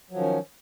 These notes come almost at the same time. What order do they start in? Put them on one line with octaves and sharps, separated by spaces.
F#3 F3 D#3 C#4